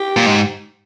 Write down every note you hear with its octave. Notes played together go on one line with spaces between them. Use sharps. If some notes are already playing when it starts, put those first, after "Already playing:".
Already playing: G4
A#2
G#2